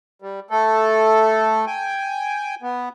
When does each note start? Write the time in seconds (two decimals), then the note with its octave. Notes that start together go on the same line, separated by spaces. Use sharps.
0.22 G3
0.50 A3 A4
1.67 G5 G#5
2.62 B3